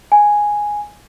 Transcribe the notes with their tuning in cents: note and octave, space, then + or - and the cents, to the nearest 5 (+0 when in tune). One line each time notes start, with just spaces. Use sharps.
G#5 +0